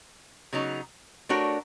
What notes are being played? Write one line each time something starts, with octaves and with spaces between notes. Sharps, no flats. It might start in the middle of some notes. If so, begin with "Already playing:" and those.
C#3 F#3 B3 D#4
A3 D4 F#4 A#4 C#5